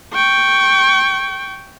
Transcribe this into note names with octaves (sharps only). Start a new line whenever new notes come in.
G5 C#6